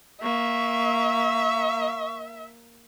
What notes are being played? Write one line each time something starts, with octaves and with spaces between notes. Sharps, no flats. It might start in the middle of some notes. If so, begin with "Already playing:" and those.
A#3 E5 C#6